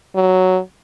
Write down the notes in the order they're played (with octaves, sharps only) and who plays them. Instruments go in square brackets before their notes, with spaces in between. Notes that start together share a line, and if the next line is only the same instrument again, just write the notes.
[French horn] F#3